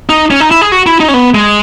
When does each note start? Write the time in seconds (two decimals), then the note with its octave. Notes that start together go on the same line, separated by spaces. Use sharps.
0.09 D#4
0.31 C#4
0.40 D#4
0.51 E4
0.61 G#4
0.72 F#4
0.86 E4
1.00 D#4
1.08 C#4
1.14 B3
1.34 G#3